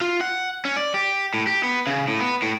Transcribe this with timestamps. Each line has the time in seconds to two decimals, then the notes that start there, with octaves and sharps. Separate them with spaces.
0.01 F4
0.21 F#5
0.65 C#4
0.77 D5
0.94 G4
1.34 A2
1.47 G4
1.63 B3
1.87 C#3
2.08 A2
2.20 B3
2.42 A2